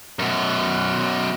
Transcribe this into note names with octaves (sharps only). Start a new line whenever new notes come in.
F#2 B2